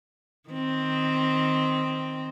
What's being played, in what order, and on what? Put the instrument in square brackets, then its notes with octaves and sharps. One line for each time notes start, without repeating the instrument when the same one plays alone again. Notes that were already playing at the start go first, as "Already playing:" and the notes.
[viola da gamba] D#3 C4